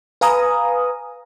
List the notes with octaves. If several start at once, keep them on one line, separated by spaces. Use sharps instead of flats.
B4 F5 G#5 A#5 D#6